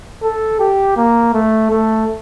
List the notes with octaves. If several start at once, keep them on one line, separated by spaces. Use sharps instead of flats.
A4
G4
A#3
A3
A3